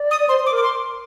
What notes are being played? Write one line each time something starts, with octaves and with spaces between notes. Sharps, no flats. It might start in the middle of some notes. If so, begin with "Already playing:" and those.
Already playing: D5
D#6
C5 C6
C5
D6
A#4
D6
C6